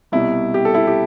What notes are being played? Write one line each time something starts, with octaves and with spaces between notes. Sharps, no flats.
C2 B2 G3 E4
G4
A4
E4 G4
G4